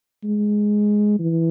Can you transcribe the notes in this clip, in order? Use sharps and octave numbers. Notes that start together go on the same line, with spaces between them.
G#3
E3